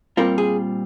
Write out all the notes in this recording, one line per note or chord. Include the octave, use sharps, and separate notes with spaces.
A#2 G3 C4 F4 A#4
G#4